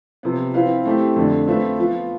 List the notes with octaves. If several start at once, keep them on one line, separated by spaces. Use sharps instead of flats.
C3 F3 B3
F3 C4 E4 B4 F5
A3 C4 E4 G4
F2 D3 A3 D4
A3 C4 F4 B4 E5
F3 B3 F4